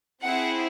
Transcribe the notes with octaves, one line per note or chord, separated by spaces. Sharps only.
C4 E4 G#4 F#5